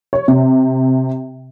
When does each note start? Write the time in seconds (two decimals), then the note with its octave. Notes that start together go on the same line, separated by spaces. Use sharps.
0.13 C#5
0.28 C3